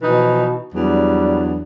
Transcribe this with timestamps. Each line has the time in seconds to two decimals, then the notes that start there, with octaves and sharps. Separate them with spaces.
0.01 B2 E3 F3 D#4
0.74 E2 F#3 G3 D4